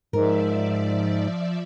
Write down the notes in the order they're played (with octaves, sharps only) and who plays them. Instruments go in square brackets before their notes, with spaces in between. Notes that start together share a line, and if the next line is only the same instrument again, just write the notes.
[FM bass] G#2 [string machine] F3 D5 E5 [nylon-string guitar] A#4